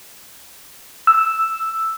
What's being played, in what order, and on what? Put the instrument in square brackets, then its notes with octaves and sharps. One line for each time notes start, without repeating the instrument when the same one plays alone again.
[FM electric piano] E6